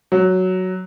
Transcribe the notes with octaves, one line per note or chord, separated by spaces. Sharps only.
F#3